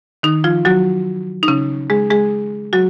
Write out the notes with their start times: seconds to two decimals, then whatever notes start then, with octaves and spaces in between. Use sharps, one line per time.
0.23 D#3 D#4
0.44 F3 F4
0.65 F#3 F#4
1.43 D#4
1.48 C#3 C#4
1.90 G#3 G#4
2.10 G#3 G#4
2.73 F#3 F#4